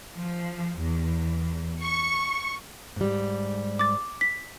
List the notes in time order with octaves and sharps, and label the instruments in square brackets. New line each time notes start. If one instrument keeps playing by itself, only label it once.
[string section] F3
E2
C#6
[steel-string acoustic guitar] G#2 G3
[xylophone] D6 A6
B6